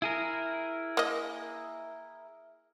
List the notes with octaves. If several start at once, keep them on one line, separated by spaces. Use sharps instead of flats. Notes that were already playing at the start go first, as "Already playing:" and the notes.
E4 G#4 A#4
A#3 D#5